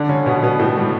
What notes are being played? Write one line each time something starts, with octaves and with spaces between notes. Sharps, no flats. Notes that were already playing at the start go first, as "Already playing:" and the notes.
Already playing: D3 D4
C#3 C#4
B2 B3
B2 B3
A2 A3
G3